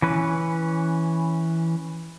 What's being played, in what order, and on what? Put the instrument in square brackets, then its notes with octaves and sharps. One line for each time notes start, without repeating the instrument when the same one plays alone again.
[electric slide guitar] E3 C#4 B4